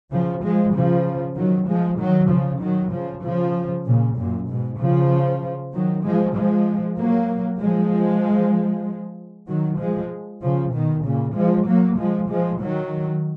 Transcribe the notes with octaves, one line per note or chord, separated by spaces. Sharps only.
C#3 F3
F3 G#3
C#3 F3
D#3 F#3
F3 G#3
D#3 F#3
C#3 F3
D#3 F#3
C#3 F3
C#3 F3
A#2 C#3
F#2 A#2
G#2 B2
C#3 F3
D#3 F#3
F3 G#3
F3 G#3
F#3 A#3
F3 G#3
D#3 F#3
F3 G#3
C#3 F3
B2 D#3
A#2 C#3
F3 G#3
F#3 A#3
F3 G#3
F3 G#3
D#3 F#3